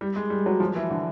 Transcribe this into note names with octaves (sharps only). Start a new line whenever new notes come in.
G3
G#3
G3
F#3
F3
E3
D3